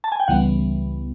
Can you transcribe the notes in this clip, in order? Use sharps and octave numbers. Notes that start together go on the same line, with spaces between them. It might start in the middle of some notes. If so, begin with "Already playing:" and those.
A5
G#5
G5
C#2 C#3 E3 G3 B3 F#5